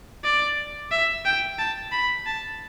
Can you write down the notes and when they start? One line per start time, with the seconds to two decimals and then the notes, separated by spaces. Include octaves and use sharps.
0.24 D5
0.91 E5
1.25 G5
1.58 A5
1.92 B5
2.26 A5